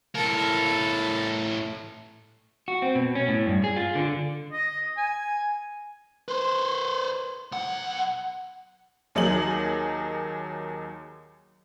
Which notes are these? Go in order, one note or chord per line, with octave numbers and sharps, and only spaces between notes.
A2 A4 A#4
F#4
C4
B2
C#4
A2
G2
G#4
F4
D3
D#5
G#5
B4 C5
B1 F#5
D#2 F#3 D#4 G#4 F#7